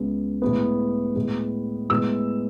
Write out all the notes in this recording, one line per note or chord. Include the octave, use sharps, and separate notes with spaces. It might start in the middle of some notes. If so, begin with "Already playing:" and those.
Already playing: C#2 C#3 G#3 B3
A2 G#3 B3
A2 G#3 B3
A2 G#3 B3 E6